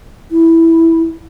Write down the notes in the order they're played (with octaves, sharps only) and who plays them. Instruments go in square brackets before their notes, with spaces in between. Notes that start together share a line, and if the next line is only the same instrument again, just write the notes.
[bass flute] E4